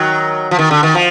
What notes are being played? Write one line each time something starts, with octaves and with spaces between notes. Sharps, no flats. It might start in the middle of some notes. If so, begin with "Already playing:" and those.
Already playing: D#3 F#3
F3
D#3
D3
D#3
F3